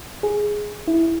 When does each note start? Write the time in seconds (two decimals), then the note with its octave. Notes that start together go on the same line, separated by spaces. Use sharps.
0.23 G#4
0.88 E4